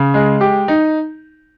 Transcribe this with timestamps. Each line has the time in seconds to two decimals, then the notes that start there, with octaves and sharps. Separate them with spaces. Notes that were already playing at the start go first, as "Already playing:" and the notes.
Already playing: C#3
0.14 G#3
0.41 G4
0.68 D#4